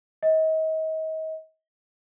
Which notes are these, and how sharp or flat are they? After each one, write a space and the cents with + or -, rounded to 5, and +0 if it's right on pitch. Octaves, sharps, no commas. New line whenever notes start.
D#5 +35